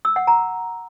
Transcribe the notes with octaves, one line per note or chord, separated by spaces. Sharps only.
E6
F#5
A#5